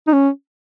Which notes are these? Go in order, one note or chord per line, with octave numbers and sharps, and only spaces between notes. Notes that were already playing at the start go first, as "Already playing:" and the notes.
D#4
C#4